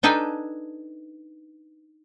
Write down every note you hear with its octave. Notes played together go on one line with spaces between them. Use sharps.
D4 D#4 A4 B4 G5 G#5